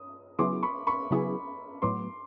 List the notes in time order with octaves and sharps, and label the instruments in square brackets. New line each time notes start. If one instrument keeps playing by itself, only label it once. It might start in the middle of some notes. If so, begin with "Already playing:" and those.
Already playing: [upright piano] D#6
[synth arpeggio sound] C#3 F#3 B3 E4 G#4 [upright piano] C6 D6
[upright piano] B5 C#6
B5 C#6
[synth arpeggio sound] C#3 F#3 B3 E4 G#4
[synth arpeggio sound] A2 F#3 B3 [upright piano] C6 D6